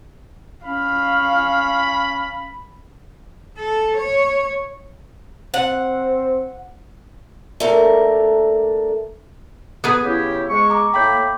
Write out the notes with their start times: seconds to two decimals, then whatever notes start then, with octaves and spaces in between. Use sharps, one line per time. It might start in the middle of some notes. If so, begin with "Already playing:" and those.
0.65 C#4 F5 B5
3.58 A4
3.97 C#5
5.54 C4 F#5
7.60 A3 A#3 D4 A4 A#4
9.84 B3 G#4 B4
10.04 C#3 E4 G4
10.50 G#3 C#6
10.70 A#5 D6
10.94 A2 A#3 G5 B5 D6 G6